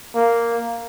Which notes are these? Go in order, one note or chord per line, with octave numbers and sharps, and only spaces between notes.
A#3